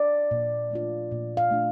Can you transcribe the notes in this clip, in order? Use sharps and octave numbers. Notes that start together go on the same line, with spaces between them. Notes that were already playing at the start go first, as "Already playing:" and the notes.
Already playing: D5
A#2
A3 D4 F4
A#2
F5
A3 D4 F4